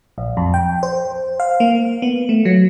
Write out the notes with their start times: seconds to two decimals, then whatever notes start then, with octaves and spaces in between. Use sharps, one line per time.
0.18 A#1
0.37 F2
0.54 G5
0.83 C5
1.40 F5
1.60 A#3
2.02 B3
2.29 A3
2.45 F#3